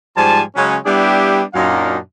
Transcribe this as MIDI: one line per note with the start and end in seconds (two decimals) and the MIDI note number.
0.16 0.41 44
0.16 0.41 53
0.16 0.41 55
0.16 0.41 80
0.16 0.41 81
0.55 0.76 49
0.55 0.76 54
0.55 0.76 56
0.55 0.76 61
0.85 1.42 55
0.85 1.42 59
0.85 1.42 62
0.85 1.42 64
0.85 1.42 67
1.54 1.97 42
1.54 1.97 46
1.54 1.97 54
1.54 1.97 62
1.54 1.97 63
1.54 1.97 77